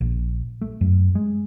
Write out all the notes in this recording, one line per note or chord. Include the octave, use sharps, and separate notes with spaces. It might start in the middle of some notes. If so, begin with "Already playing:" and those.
A#1
A3
F#2
G#3